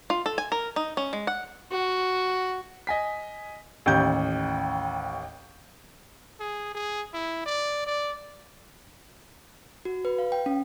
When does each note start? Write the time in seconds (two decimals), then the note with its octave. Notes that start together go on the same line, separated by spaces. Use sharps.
0.10 F4
0.26 A4
0.38 G#5
0.52 A#4
0.76 D#4
0.97 C#4
1.13 G#3
1.27 F#5
1.71 F#4
2.87 D#5 G#5 B6
3.86 A1 D#2 G6
6.40 G#4
6.75 G#4
7.14 E4
7.46 D5
7.86 D5
9.85 F#4
10.05 B4
10.18 F5
10.32 G5
10.46 C#4